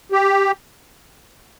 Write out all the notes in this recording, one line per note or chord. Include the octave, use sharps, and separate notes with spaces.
G4